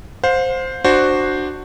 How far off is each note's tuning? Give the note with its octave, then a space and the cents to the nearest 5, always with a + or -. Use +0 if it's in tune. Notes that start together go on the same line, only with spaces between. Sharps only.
C5 +0 F5 +40
D4 +15 F#4 +0 C5 +0